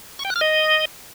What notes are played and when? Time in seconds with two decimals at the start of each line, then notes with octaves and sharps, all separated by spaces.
0.19 C#6
0.25 G5
0.30 F#6
0.36 F6
0.41 D#5